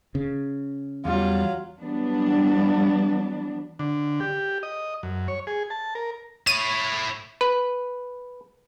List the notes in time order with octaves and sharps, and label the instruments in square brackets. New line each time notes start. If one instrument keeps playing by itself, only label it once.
[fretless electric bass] C#3
[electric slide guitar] E2 G3 [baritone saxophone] F#3 [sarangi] F4
[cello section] E3 F#3 G3 B3 D4
[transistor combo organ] D3
G4
D#5
F#2
C#5
G#4
A5
A#4
[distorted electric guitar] E4 C#5 [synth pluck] D#7
[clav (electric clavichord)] B4